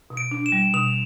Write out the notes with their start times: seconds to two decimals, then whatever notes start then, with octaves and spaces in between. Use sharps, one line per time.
0.10 B2
0.17 D7
0.31 D4
0.46 E7
0.52 G3
0.73 B2 F7